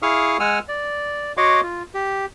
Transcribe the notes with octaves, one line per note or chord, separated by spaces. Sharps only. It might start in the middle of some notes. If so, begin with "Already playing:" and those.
E4 G#4 F5 C#6 D#6 F6
G#3 F#5 G#5 E6 F6
D5
F#4 C#5 D#5 F#5 C6 D6
F4
G4